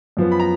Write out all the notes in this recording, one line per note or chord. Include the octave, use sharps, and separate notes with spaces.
F#2 F3 B3
B5
A#5